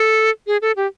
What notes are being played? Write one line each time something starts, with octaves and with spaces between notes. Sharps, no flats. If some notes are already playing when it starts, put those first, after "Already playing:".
Already playing: A4
G#4
A4
G4